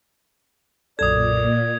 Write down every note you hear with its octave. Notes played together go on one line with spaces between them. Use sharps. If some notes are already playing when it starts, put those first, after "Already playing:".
B1 F#2 A#2 A4 D5 D#6 G#6